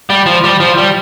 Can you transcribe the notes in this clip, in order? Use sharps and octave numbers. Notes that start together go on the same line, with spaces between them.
G3
F3
G3
F3
G3